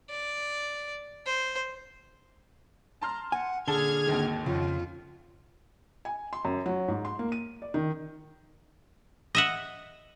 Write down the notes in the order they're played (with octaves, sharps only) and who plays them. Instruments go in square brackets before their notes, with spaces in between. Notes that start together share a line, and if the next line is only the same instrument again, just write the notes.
[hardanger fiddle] D5
C5
[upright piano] A5 C6 F6 [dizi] A#5
[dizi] F#5 [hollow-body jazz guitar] G#5
[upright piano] D#1 A5 G7 [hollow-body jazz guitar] D3 [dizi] G#4 [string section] F6 G#6
[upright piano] G#1 D#2 D#3
[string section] F2 [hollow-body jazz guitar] C#3 [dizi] F4
[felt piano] G#5
C6
F#2
F#3
G#2
C6
A#3
D#7
D5
D#3
[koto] D#5 E5 F#5